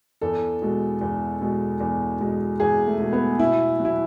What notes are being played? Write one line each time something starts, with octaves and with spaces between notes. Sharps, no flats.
E2 A4
B2 G#3
E2
B2 G#3
E2
B2 G#3
E2 G#4
A3
B2 G#3
B3
B2 E4
F#3
E4